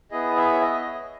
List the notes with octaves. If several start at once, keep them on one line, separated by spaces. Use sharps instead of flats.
B3 E4 G#4 D#5
E5
C#5
D#5